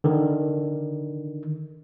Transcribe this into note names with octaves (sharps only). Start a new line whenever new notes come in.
D3 D#3